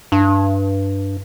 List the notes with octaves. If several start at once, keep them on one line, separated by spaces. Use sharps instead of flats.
G2